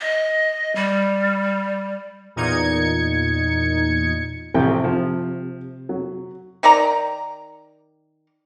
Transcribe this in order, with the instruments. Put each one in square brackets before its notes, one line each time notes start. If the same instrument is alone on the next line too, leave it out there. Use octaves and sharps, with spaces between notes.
[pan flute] D#5
G3
[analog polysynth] E2 A#2 D#4 G#6 C#7
[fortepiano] A1 F3 G5 [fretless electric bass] C3
[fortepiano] F3
F#3
[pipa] D#3 A#4 D5 A#5